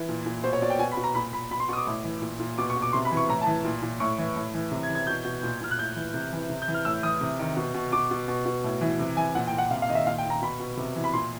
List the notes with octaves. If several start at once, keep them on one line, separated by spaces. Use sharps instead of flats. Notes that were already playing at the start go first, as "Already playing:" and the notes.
Already playing: E3
A#2
A#2
B2 C5
C#5
B2 D5
G5
B2 G#5
B5
B2
A#5
A#2 B5
A#2 B5
B2 B5
C6
B2 C#6 D#6
D6
A2
E3
A#2
A#2
B2 D6
C#6
B2
D6
C3 C6
B5
E3
C#6
A2 A#5
A5
E3
A#2
A#2
A2 C#6
E3
A2
E3
C3
G#6
E3
G#6
B2 G6
B2
A#2
A#2 F6
F#6
A2 G6
E3
C3
E3
C3
G6
E3
F6
A2 E6
E3 D#6
C3
D#3
B2
B2
B2 D6
B2
B2
B2
A2
E3
C3
E3 G#5
A#2 F#5
G5
A#2
F#5
C3 F5
F5
D#3 D#5
E5
A#2 F5
G5
A#2
A#5
B2 B5
B2
C3
E3
B5
A#2 C6